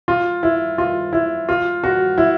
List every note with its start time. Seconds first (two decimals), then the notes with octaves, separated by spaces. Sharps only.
0.08 F4
0.43 E4
0.78 F4
1.13 E4
1.49 F4
1.84 F#4
2.18 E4